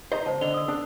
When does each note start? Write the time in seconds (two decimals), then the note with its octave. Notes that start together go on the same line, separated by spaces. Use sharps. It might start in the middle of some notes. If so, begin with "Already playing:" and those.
0.12 C5 D#5 A#5
0.26 C#2 C5 A5
0.41 D3 D#5 F7 G7
0.54 D#6 E6
0.68 D4